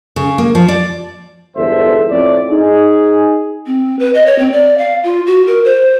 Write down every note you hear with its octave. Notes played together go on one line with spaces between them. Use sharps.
C#3
A#3
F3
D5
G1 E2 G#2 A4 C5 E5
F2 A2 D5
D#4 G#4
C4
B4
D#5
C#5
C4
D5
F5
F4
F#4
A#4
C5